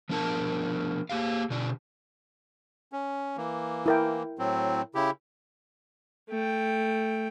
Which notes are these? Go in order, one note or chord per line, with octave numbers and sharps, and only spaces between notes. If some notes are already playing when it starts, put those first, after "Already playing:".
F3 B3 D4 A#4 A5
A#3 G4 G#4 F5
B2 D3 D5
C#4
E3 A#3
E4 A#4 G5
A2 F#3 C4
C#3 E4 G4
A3 G5